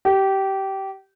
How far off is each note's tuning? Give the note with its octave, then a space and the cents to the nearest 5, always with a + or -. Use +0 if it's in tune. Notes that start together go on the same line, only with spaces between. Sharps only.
G4 -20